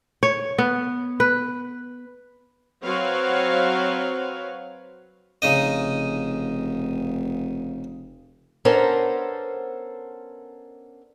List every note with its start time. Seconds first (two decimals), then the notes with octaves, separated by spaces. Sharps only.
0.23 C#5
0.58 B3
1.20 B4
2.83 F#3 C4 F#4 B4 C#5 F5
5.42 F1 C#3 D#4 D#5
8.65 B3 C#4 D4 A4 A#4 C5